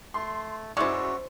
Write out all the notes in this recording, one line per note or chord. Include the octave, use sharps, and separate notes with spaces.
A3 C6
F#2 G#3 E4 F#4 C5 D5 C#6 E6